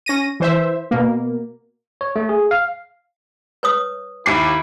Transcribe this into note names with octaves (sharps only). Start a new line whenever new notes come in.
C#4 A#6 D#7
E3 C5 E5
B2 A#3
C#5
A3
G#4
F5
B4 C#5 D#6
D#2 E4 D6 C7